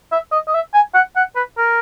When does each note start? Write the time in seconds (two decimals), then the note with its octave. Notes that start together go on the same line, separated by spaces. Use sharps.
0.12 E5
0.32 D#5
0.47 D#5
0.54 E5
0.74 G#5
0.94 F#5
1.16 F#5
1.36 B4
1.57 A#4